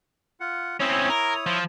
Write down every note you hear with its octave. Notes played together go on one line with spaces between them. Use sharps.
F4 F#5
C4 C#4 E4 C#5 D#6
A#4
F3